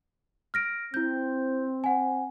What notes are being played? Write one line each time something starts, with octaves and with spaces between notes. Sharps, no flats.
F6 A#6 D7
C4 E4 G6
F#5 G#5